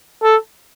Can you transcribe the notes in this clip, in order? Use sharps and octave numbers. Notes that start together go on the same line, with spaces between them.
A4